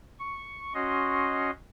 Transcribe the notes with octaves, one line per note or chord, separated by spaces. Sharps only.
C#6
C#4 F#4 D#5 C6